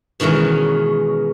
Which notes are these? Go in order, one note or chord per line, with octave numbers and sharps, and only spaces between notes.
B2 D#3 E3 G#3 C#4